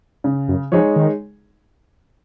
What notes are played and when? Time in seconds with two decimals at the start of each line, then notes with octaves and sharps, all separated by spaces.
0.24 C#3
0.48 F#2
0.72 F3 G#3 D#4 G#4 C#5
0.96 D#3